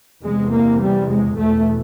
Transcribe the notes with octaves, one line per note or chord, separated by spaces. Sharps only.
E2 C3 G#3
A#3
G3
G#3
E2 B2 A3